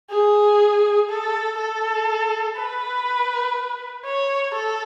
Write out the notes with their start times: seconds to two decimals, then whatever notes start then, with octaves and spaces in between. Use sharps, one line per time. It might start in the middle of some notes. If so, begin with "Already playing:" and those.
0.10 G#4
1.09 A4
1.58 A4
2.57 B4
4.05 C#5
4.54 A4